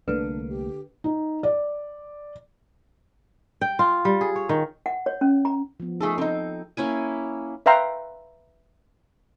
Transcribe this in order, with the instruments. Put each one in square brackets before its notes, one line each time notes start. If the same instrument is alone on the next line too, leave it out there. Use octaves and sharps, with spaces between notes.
[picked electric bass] C2 A3 A#3 [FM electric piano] D3 [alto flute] D4 [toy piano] B4
[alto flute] G4
[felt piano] D#4
D5
[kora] G5
F4
G3
G#4
C#5
D#3
[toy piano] F#5
C#5
C#4
A#5
[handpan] F3 B3
[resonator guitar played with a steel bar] A3 G#4 A4 [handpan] D#4
[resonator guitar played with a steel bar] C4 D#4 [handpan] A4 C5
[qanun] A#3 C#4 E4 G#5
[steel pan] B4 E5 F5 G5 A#5 C6